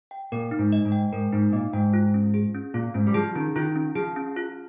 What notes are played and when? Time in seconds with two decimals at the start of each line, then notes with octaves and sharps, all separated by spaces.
0.11 G5
0.32 A#2 A#4
0.51 D#4
0.59 G#2
0.72 D#5
0.85 G#2
0.92 G5
1.12 G#2 A#4
1.33 G#2 D#4
1.53 A#2 D#5
1.73 G#2 G5
1.94 F4
2.14 C#4
2.34 G#4
2.54 C#4
2.74 A#2 F4
2.94 G#2 C#4
3.07 G3
3.14 F3 G#4
3.35 D#3 C#4
3.56 D#3 F4
3.76 C#4
3.95 F3 G#4
4.16 C#4
4.37 F4